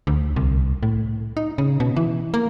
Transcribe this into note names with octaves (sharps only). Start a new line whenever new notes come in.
D2
C2
A2
D#4
C#3
B2
E3
A#3